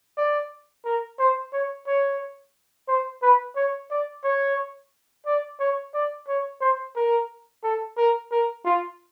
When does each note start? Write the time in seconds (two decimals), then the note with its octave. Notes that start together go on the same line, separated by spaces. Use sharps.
0.17 D5
0.85 A#4
1.19 C5
1.53 C#5
1.87 C#5
2.88 C5
3.22 B4
3.56 C#5
3.91 D5
4.24 C#5
5.26 D5
5.60 C#5
5.94 D5
6.28 C#5
6.61 C5
6.96 A#4
7.63 A4
7.98 A#4
8.31 A#4
8.65 F4